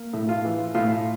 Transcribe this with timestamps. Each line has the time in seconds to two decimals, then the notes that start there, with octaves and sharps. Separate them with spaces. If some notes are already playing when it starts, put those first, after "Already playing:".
Already playing: A#3
0.13 A2
0.29 F4
0.45 E3
0.75 A2 F4